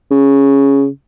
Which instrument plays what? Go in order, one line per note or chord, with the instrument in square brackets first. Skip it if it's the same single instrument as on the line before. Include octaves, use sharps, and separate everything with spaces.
[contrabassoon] C#3